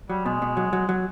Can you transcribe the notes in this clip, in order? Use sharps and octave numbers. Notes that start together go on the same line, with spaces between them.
F#3 G3
B2 G#3
B2
F#3
F#3
F#3